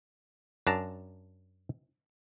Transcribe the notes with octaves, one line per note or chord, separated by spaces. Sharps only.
F#2 D4 A5 A#5